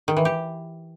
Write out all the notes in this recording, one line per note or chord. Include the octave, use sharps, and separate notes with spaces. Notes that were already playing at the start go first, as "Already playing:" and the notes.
D#3
E3
G4